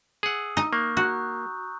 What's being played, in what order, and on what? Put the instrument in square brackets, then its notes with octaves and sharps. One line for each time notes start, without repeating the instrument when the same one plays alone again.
[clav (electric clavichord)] G#4 F#5 [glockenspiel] D#6 E6
[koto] D#4 D#5
[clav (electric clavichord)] A#3 [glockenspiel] C#6 F#6 G6
[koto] F#4 [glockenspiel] A#5 C#6 F#6